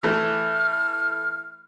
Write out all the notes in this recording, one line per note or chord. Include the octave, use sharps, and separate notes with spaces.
E3 A3 F6